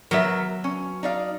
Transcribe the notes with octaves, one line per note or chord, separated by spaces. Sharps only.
F#3 B3 A#4 E5
C#4
D#4 D5 F5